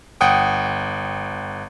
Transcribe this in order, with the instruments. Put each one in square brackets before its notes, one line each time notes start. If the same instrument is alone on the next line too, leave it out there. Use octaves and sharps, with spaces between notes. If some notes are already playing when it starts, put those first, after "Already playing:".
[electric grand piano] G1 F#5 G5 D#6